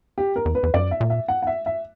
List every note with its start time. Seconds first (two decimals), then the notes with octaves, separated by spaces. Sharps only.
0.18 G4
0.36 A#4
0.45 E2
0.55 B4
0.63 E2
0.74 F#2 D5
0.91 E5
1.01 A#2
1.10 E5
1.28 F#5
1.42 F#5
1.47 E5
1.66 E5